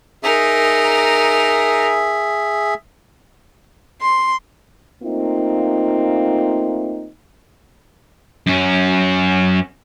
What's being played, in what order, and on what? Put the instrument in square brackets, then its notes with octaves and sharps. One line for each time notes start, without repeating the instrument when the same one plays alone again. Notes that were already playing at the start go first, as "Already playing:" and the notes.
[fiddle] D#4 A#4 [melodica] G#4 E5
[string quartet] C6
[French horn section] A3 A#3 C4 D#4 F4
[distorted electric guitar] F#2 C#4